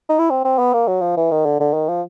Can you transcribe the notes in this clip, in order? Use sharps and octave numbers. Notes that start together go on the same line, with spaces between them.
D#4
E4
C4
C4
B3
A#3
F#3
F3
E3
D#3
D3
D3
D#3
F3